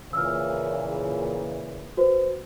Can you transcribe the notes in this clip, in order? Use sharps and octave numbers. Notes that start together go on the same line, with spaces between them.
A#2 C#3 E3 E6 F6
F#4 B4 C5